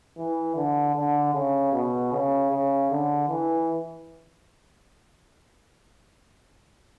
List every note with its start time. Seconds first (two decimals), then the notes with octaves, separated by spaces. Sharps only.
0.18 E3
0.56 D3
0.95 D3
1.34 C#3
1.73 B2
2.12 C#3
2.51 C#3
2.91 D3
3.29 E3